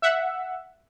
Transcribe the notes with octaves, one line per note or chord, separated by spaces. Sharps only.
E5 F#5